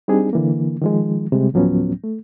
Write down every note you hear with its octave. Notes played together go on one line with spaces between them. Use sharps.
G3 C4 D4 D#4 G#4
D3 E3 A#3
D#3 F3 G#3
C3 G3 G#3
D2 A2 F3 F#3 B3 C#4
A3